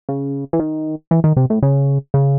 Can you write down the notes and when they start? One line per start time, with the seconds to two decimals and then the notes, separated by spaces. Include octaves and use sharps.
0.09 C#3
0.53 E3
0.59 D#3
1.11 E3
1.24 D#3
1.37 C3
1.50 A2
1.63 C#3
2.14 C#3